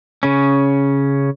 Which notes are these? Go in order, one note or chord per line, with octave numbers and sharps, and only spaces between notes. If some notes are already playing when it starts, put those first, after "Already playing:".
C#3 C#4